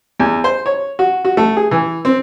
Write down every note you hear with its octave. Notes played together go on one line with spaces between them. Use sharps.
E2
C5
C#5
F#4
F#4
A3
G#4
E3
C4